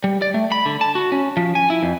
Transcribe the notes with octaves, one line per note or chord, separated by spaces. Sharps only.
G3
D5
A3
B5
D3
A5
F#4
C#4
F3
G#5
E4
F2